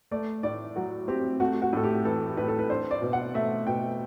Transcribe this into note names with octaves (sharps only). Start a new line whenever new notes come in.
A3 D5
A2 D5
F#3 F#4
C4 G4
A3 F#4
F#4
A2 A4
G4
E3 A4
A2 B4
A4
B4
D4 C5
D5
B2
F#5
A3 E5
B2 G5